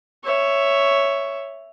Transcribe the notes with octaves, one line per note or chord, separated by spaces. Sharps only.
C#5 E5